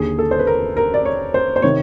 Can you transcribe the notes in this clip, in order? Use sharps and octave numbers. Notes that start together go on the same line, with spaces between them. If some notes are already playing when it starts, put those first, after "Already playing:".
Already playing: D#2 D3 G#4
A4
C5
B4
A#4
A#4
D5
C#5
C5
C5
C3 D#3 C#5